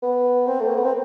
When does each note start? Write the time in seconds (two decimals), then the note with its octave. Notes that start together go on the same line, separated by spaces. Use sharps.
0.03 B3
0.47 C4
0.60 A3
0.68 A#3
0.76 B3
0.84 C4